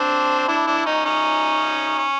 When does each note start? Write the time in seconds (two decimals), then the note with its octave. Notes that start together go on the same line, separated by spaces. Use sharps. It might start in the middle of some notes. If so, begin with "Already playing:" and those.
Already playing: C4 D4
0.48 D4 E4
0.67 D4 E4
0.86 C#4 D#4
1.05 C#4 D#4
1.99 C#4